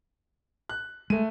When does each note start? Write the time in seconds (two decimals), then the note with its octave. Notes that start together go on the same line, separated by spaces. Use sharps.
0.69 F#6
1.10 G#3 A3 D#7